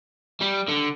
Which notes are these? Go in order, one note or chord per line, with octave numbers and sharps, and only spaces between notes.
G3
D3